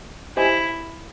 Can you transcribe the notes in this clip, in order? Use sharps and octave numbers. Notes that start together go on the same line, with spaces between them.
E4 G4 C5 D#5 G#5